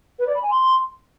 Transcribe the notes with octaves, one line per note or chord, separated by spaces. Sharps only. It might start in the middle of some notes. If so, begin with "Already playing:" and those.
B4
D5
B5
G#5
C6